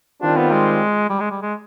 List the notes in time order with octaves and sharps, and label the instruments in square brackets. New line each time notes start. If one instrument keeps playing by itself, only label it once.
[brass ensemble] D#3 G3 C4 F4 [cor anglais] D4
[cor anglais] B3
G#3
G3
G#3
G3
G#3